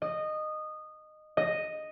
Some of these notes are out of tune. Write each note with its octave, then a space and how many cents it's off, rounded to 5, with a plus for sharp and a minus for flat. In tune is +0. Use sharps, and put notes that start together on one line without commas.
D#5 -15
D#5 -5